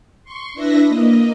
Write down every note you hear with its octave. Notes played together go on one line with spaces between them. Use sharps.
C6 C#6
D4 E4 B4 E5 A#6
A#3 D#5